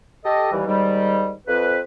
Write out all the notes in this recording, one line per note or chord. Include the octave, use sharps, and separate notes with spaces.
G4 A4 D#5
D#2 E3 G3
D#2 G#2 D#3 G3
F2 B4